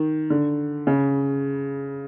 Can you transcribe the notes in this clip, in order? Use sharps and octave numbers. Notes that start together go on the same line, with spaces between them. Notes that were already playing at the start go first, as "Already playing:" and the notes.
Already playing: D#3
D3
C#3